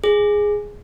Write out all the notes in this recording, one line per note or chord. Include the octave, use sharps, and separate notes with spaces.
G#4